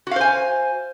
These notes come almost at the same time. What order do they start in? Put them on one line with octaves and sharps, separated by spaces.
F#4 F5 C5 G#5